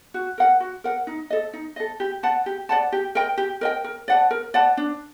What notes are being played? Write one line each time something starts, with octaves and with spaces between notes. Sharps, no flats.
F#4
A#4 F#5
F#4
A#4 F#5
D#4
A4 D#5
D#4
A4 D#5
G4
D5 F#5 A5
G4
D5 F#5 A5
G4
A#4 D#5 G5
G4
A#4 D#5 G5
A#4
D5 F#5 A5
A#4
D5 F#5 A5
D4